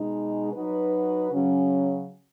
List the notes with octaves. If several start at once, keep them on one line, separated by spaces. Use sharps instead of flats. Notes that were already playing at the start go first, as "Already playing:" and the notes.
Already playing: B2 G#3 D#4
F#3 D#4 F#4 B4
C#3 F#3 C#4